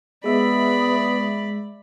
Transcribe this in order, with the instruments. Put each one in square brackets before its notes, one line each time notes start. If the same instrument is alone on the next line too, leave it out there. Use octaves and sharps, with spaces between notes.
[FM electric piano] G#3 E5 [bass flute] B3 [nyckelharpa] D5 B5